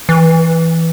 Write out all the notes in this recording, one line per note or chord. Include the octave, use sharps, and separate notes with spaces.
E3